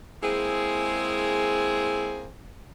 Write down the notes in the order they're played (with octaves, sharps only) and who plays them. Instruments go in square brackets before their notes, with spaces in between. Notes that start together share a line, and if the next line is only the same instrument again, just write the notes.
[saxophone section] G#3 A#3 C4 E4 G#4